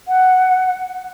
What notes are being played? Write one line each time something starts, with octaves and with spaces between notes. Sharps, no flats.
F#5